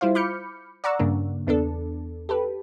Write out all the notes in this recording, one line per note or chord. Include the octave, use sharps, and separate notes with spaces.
G3 E4 F4 C5 F5
B5 D6 F6 G6 C#7
D5 F#5 A#5 C#6 E6
G2 C#3 A#3 D4
E2 B3 D4 A4
G4 A4 B4